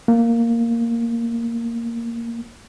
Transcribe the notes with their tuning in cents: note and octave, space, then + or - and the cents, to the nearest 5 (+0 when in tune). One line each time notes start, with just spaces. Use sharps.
A#3 -5